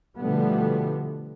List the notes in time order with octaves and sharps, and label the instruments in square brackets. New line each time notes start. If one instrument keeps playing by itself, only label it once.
[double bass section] B2 D3 F3 G3 A3 B3